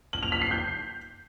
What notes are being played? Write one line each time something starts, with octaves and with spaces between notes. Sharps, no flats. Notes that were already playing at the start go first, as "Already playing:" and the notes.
F#7
F7
B6
C7
G6